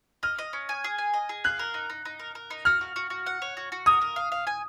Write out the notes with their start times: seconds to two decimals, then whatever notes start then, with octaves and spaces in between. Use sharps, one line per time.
0.23 D#5 F6
0.39 D#5
0.53 C#4
0.69 G#5
0.84 G#4
0.98 G#5
1.14 D#5
1.29 G#4
1.44 F5 F#6
1.59 A#4
1.74 D#4
1.90 D#4
2.05 D#4
2.19 A#4
2.35 A#4
2.50 D#4
2.65 F#4 F6
2.81 F#4
2.96 F#4
3.10 F#4
3.26 F#5
3.42 C#5
3.57 F#4
3.72 F#4
3.86 A#4 D#6
4.02 A#4
4.16 F5
4.32 F5
4.47 G#5